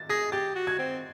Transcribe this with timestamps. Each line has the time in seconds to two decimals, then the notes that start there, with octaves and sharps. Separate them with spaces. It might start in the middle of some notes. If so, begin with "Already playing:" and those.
Already playing: A6
0.09 G#4 A#6
0.32 G4 A6
0.56 F#4
0.67 G#6
0.79 C4